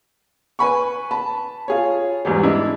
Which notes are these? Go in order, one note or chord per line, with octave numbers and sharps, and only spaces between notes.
B4 G#5 B5 C#6
A5 B5
F4 G#4 C#5
E2 G#2 G3
G#3 D4 E4